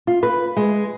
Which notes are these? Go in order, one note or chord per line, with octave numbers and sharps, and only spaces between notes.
F4
B4
G#3